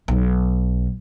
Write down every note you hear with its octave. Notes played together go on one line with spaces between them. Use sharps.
B1